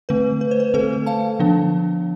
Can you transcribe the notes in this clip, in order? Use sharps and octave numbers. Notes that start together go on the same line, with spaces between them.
D3 A3 C4 B4
B4
C5
B4
D3 A3 C4 A4 C5
F5 A5
D3 F3 B3 D4